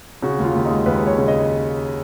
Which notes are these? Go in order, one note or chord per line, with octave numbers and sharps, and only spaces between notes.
C#3 F#4
D#2
F4
D#2
G#3 D#4
D#2 B4
G#3 C#5
C#3
D#5